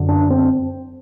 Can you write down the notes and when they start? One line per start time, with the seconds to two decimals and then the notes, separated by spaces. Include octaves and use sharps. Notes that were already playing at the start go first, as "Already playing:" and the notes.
Already playing: F#2 D3
0.09 D4
0.30 C4